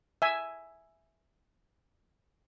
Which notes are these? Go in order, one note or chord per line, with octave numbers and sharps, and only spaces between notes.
E5 G#5